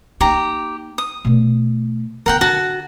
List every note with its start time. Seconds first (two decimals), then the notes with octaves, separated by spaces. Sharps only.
0.21 A#3 D#4 G4 A#5
0.98 D#6
1.25 B2 A3
2.26 D3 B3 A#4 F#5 G5
2.41 D3 F#4 A5